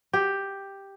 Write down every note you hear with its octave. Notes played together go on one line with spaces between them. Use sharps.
G4